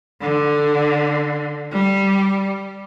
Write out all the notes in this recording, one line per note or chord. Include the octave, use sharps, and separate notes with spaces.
D3
G3